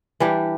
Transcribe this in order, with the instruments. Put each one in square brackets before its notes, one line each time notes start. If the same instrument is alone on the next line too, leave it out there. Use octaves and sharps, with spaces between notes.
[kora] E3 G3 D4 G4